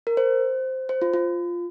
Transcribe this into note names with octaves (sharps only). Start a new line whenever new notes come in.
A#4
C5
C5
F4
F4